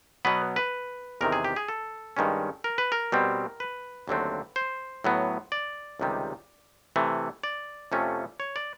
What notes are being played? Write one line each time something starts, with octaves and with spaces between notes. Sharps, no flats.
B2 F#3 B3 B4
B4
E2 C3 D#3 A#4
G#4
G4
G#4
A4
G2 D#3 G#3 C#4
A#4
B4
A#4
B2 G3 C4
B4
D#2 D3 F#3 A3 C4
C5
A2 F#3 B3
D5
C#2 C3 D#3 G3
C3 E3 A3
D5
F2 C3 F3 A3 C#4
C#5
D5